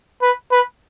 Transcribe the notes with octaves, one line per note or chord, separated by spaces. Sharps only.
B4
B4